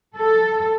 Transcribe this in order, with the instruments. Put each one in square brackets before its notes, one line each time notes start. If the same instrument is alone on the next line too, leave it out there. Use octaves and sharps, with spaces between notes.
[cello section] A4